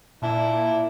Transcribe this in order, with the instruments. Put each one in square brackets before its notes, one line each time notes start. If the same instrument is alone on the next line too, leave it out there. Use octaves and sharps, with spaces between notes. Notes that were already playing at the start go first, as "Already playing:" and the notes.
[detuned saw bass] A#2 [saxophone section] D4 E4